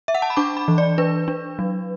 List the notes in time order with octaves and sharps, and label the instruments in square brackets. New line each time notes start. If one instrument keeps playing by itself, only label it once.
[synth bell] E5
F#5
A5
B5
D4 D6
B5
E3
D5
D4 B4
D4
F#3